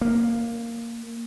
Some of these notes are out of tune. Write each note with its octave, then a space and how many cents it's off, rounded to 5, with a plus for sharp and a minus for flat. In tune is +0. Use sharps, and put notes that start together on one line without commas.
A#3 -5